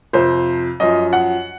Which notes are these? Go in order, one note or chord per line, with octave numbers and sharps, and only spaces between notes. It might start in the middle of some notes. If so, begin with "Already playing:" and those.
F2 C3 F3 C5
F#2 F3 D#5
F#5